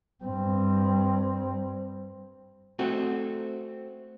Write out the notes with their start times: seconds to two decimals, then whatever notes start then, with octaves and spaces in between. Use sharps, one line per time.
0.24 G2 C4
2.79 A3 C4 F#4